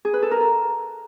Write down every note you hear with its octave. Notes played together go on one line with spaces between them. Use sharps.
G#4
B4
A4
A#4
A4